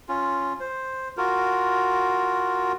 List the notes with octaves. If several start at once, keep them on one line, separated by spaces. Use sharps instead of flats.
C#4 F4
C5
F4 F#4 A#4